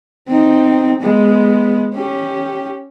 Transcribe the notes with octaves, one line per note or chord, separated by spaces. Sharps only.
C4 D#4
G#3 B3
C#4 G4